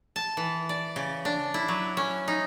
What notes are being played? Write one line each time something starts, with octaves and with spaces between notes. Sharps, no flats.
A5
E3
D5
C#3
D4
E4
F#3
C#4
D#4